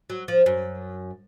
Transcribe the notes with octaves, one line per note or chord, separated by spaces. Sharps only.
F#3
F3
F#2